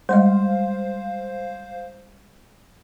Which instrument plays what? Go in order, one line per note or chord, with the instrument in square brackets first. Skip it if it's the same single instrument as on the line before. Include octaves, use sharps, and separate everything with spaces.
[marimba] G3 G#3 D#5 [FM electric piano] C5 F5